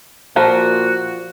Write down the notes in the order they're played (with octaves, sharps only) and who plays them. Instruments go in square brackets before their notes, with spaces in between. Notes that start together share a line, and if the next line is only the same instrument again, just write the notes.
[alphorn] A#2 [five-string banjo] F3 A#4 [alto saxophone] F#4